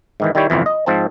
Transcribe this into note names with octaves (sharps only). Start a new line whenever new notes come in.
G#2 D#3 E3
D#3 G3 E4 G4 C#5
G1 C2 F2 E3
D#5
G#2 F3 C4 A5